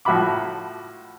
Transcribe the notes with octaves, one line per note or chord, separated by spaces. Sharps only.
A2 F3 F#4 E5 B5 D6